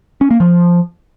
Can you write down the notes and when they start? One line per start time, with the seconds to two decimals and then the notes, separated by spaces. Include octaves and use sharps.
0.21 C#4
0.31 A#3
0.40 F3